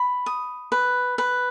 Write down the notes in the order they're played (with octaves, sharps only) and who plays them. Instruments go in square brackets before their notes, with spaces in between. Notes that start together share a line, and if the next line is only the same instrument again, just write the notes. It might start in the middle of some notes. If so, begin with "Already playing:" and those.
Already playing: [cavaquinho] B5
D#6
B4
B4